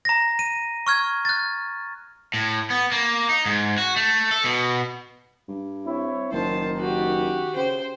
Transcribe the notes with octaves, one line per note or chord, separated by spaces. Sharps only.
A#5 A#6
D#7
C#6 F6 G#6
F#6 A6
A2
B3
A#3
D#4
G#2
F#4
A3
A4
B2
G2
C4 E4 C#5
F#1 D#3 C5 A5
F#4 G4
C#3 C5 G5